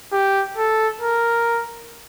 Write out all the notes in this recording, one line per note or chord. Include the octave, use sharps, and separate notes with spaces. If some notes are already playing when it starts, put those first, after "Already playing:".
G4
A4
A#4